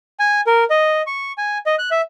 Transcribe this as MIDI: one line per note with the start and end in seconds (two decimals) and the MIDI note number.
0.20 0.41 80
0.47 0.64 70
0.70 1.02 75
1.07 1.32 85
1.38 1.58 80
1.66 1.75 75
1.79 1.89 90
1.91 2.01 76